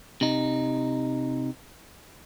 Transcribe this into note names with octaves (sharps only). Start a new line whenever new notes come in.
C3 D#4